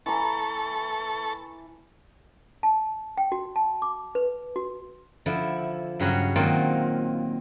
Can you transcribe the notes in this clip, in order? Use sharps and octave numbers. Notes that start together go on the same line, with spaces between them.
E3 A4 A5 A#5 C#6
A5
G5
F#4
A5
D6
B4
F#4
D3 F3 E4
G2 C#3 F#3 C#4 F#4
A#2 D#3 F#3 C4 F4